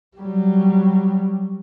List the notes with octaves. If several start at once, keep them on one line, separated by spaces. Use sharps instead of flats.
F#3 G3